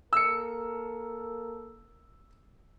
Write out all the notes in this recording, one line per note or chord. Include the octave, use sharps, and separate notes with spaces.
A#3 A4 A#4 E6 C#7